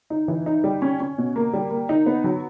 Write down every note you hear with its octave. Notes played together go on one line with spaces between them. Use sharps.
D#4
E3
D#4
G3
C#4
C#4
B2
A#3
G3
A#3
D#4
B3
F#3